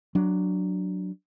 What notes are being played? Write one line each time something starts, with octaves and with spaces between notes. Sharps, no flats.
F#3 D4